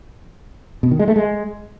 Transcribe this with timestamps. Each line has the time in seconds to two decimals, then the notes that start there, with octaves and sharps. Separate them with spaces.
0.83 B2
0.91 D#3
0.99 G#3
1.08 A3
1.16 G#3